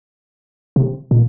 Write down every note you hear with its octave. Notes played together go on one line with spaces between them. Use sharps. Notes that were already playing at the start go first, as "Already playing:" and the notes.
C3
A#2